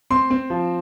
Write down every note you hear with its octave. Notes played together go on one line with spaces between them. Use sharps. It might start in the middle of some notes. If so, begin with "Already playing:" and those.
C4 C6
C4
F3